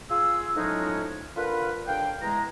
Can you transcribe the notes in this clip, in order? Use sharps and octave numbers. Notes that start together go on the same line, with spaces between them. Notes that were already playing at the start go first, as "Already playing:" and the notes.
F4 G#4 E6
A2 F3 F#3 G#3 C#4 D#4
D3 F4 A#4 B4
D#2 D3 F5 G5
E2 G#3 A#5